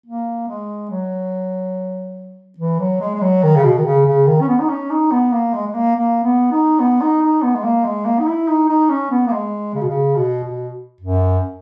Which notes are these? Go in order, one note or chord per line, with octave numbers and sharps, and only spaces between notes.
A#3
G#3
F#3
E3
F#3
G#3
G#3
F#3
D#3
C#3
B2
D#3
C#3
C#3
D#3
C#4
B3
D#4
C#4
D#4
B3
A#3
G#3
G#3
A#3
A#3
B3
D#4
B3
D#4
D#4
B3
G#3
A#3
G#3
A#3
D#4
E4
D#4
D#4
C#4
B3
A#3
G#3
C#3
B2
C#3
B2
B2
F#2